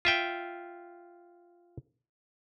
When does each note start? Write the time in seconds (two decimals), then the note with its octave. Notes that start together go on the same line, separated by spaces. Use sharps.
0.05 F4 E5 G5